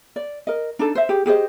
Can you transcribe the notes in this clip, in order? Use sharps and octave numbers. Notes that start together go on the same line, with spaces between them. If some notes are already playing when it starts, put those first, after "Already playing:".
D5
A#4 D#5
D4 D#4 A4
C5 E5
G4 G#4
G4 G#4 C5 D#5